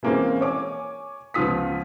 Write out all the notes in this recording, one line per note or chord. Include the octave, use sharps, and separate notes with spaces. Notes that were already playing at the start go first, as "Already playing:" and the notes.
E3 G#3 A#3 C4 C#4
C#5 G#5 D6
C#2 F3 B3 F4 D#6 B6